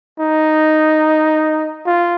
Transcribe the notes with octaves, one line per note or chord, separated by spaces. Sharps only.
D#4
F4